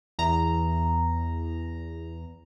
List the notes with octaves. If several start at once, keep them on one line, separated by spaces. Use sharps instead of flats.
E2 A#5